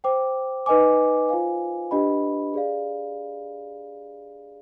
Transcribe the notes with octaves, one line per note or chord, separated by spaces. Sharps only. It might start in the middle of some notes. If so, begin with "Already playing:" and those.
C5 G5 D6
D#4 B4 D#5 G#5 D6
F4 C5 F5 G#5
D4 G4 B4 D#5 B5
G#4 D5 F5